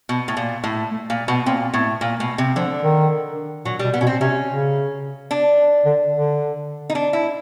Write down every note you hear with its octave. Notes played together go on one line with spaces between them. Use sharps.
B2
A2
A#2
A2
A3
A#2 A#3
B2 B3
A#2 C4
A2 B3
A#2 A#3
B2 A3
C3
D3 F3
D#3
A#2 F#3
G3
B2
B3
B2 C#4
C4
C3 C#4
C#3
D4
D3
D3
D#4
D4
E4